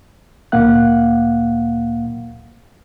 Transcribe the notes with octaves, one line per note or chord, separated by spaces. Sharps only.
D2 A#2 A#3 F5 F#5 F#6